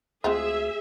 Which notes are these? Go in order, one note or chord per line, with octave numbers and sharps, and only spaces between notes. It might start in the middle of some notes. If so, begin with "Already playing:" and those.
D2 G#3 C4 F4 G#4 E5